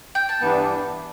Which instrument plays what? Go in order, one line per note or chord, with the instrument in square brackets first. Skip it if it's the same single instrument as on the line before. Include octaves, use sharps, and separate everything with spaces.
[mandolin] G5
A5
[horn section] G2 E3 G3 B3 D4